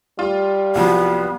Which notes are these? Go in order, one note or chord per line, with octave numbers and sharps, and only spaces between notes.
G3 F4
C2 F3 F#3 B3